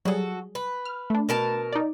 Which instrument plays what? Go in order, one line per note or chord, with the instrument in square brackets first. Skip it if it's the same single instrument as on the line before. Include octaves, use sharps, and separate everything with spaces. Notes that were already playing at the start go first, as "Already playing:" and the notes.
[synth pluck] F#3 G3 G#4 [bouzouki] F#4 A4
[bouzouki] B4
[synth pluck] F6
A3 D4
[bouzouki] B2 A#4 A5
[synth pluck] D#4 D5